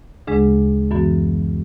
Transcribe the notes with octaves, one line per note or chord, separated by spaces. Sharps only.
D2 C#3 G#3 D4 G#4
F#2 E3 B3 F#4